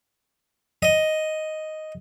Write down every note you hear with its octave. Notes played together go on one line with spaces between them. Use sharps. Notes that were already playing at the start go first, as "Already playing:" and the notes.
D#5